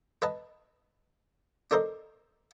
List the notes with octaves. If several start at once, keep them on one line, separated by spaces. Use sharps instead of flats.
B4 D#5 A5
D4 A4 A#4 C5 D#5